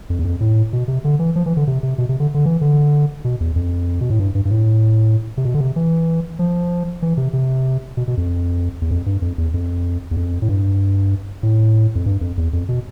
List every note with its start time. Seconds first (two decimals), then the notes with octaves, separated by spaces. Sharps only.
0.10 F2
0.19 E2
0.25 F2
0.41 A2
0.73 B2
0.88 C3
1.04 D3
1.19 E3
1.36 F3
1.46 E3
1.57 D3
1.67 C3
1.83 C3
1.98 B2
2.09 C3
2.20 D3
2.34 D3
2.46 E3
2.61 D3
3.24 B2
3.40 E2
3.56 F2
4.01 B2
4.10 A2
4.19 G2
4.35 G2
4.45 G2
4.50 A2
5.37 C3
5.45 B2
5.54 D3
5.61 C3
5.76 E3
6.39 F3
7.02 E3
7.17 C3
7.33 C3
7.97 B2
8.08 B2
8.17 F2
8.82 E2
8.91 F2
9.06 G2
9.22 F2
9.38 E2
9.54 F2
10.11 E2
10.17 F2
10.42 A2
10.49 G2
11.43 A2
11.95 F2
12.06 G2
12.21 F2
12.37 E2
12.53 F2
12.69 B2